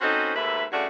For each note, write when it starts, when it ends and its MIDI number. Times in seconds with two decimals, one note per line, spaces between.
0.01 0.35 60
0.01 0.35 61
0.01 0.35 63
0.01 0.35 66
0.01 0.35 69
0.01 0.35 72
0.35 0.64 39
0.35 0.64 44
0.35 0.64 57
0.35 0.64 71
0.35 0.64 76
0.72 0.86 43
0.72 0.86 49
0.72 0.86 57
0.72 0.86 62
0.72 0.86 65
0.72 0.86 66